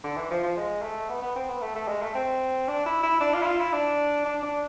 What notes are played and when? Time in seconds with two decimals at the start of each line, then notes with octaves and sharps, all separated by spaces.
0.04 D3
0.17 E3
0.31 F3
0.44 F3
0.57 G#3
0.82 A3
1.09 B3
1.22 B3
1.36 C4
1.49 B3
1.62 A3
1.75 A3
1.88 G#3
2.02 A3
2.15 C4
2.68 D4
2.86 E4
3.03 E4
3.21 D4
3.34 F4
3.42 E4
3.47 F4
3.60 E4
3.73 D4
4.26 D4
4.43 D4